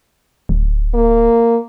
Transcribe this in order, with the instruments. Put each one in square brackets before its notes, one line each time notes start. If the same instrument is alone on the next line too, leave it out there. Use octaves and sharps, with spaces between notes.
[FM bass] D1
[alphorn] A#3